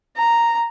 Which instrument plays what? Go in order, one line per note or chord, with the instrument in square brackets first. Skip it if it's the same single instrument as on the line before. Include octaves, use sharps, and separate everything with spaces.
[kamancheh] A#5